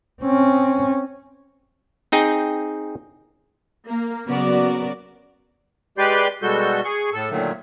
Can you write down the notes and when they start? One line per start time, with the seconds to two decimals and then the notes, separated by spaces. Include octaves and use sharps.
0.22 C4 C#4
2.12 C4 D#4 G#4 G5
3.89 A#3
4.26 C#3 F#3 B3 F#4 A#4 D5
5.98 G#3 G4 B4 D5 C6 G6
6.42 B2 G3 G#3 F#4 A4 G6
6.85 G#4 C#6
7.13 A2 A4
7.30 A#2 D3 D#3 F#3 A3